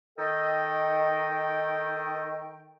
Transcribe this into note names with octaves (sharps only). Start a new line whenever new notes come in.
D#3 A4 D#5 G5